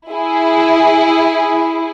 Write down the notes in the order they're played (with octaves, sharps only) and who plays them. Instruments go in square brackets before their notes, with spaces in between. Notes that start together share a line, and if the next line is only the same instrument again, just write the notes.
[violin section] E4 G#4